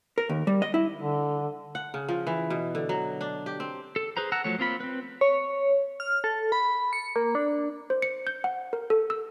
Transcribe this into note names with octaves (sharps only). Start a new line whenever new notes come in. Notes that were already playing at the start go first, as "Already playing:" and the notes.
A#4
D#2
G3
D#5
E4
D3
F#5
C#3
F3
E3
B2
D3
F#3
D4
G4
C4
A4
G#4 B4 C5 A#5
F#5 A5 A#5 E6 F#6
F3 F#3 A3 C#5
A#3 C4 F4 B5
C4 B4
C#5
F6
A4
B5
C#7
A#3
D4
C5
C#7
G6
F#5
A#4
A4
E6